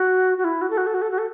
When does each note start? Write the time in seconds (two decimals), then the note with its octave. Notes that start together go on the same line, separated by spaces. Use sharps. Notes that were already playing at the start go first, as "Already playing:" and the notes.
Already playing: F#4
0.38 F#4
0.44 E4
0.62 F#4
0.70 A4
0.77 F#4
0.87 A4
0.94 F#4
1.02 A4
1.11 F#4
1.18 A4